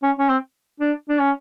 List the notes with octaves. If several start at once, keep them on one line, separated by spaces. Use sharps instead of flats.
C#4
C#4
C4
D4
D4
C#4